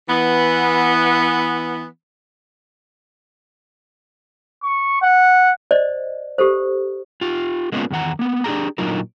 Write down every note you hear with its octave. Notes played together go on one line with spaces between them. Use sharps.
E3 B3
C#6
F#5
C5 D5 D#5
G4 A4 C5
F4 G4
G#3 A#3 B3 C#4 E4 F4
E2 D#3 F#5 A#5
A#3 B3
D4 G4 G#4 A#5
A#2 D3 F#3 D#4 F4 A#4